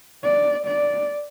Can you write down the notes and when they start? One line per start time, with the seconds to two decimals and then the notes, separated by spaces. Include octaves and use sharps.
0.24 D5
0.67 D5